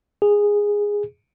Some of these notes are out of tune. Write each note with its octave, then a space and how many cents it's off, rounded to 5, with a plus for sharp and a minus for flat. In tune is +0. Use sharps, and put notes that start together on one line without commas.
G#4 -10